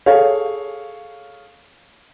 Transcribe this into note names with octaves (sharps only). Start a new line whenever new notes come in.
G#4 A4 C#5 F5